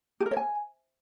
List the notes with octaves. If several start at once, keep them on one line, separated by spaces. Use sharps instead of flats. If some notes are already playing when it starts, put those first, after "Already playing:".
G4
A#4
C#5
G#5